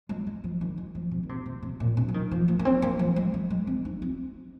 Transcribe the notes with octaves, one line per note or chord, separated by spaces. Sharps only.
G#3
G#3
F3
D#3
G#3
F3
C3
D#3
C3
C3
C3
A#2
C3
F3
D#3
F3
A#3
A#3
C4
A#3
F3
G#3
F3
G#3
C4
D#4
C4